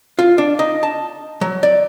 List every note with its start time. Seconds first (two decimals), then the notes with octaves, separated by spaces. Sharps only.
0.19 F4
0.38 D4
0.59 D#4
0.83 A5
1.41 F#3
1.63 D5